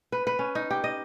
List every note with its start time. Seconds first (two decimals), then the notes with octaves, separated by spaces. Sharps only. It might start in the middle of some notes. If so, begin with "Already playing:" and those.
0.12 B4
0.27 B4
0.39 C#4
0.55 D#4
0.71 G4
0.84 D#5